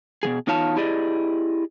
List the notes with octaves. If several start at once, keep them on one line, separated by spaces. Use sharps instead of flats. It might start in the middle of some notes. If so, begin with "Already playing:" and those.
B2 F3 G#4
E2 D#4 F4 C#5 F5 A5
E4 G4 G#4 D5 D#5